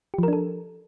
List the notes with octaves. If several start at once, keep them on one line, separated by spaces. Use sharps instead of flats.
F3 D4 G4 A4 A#4